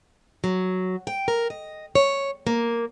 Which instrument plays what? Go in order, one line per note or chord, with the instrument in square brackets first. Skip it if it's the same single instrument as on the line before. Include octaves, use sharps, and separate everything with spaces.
[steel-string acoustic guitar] F#3
G5
A#4
D#5
C#5
A#3